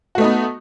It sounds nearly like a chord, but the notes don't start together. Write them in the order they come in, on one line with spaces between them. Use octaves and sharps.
F#4 A3 D#4 B3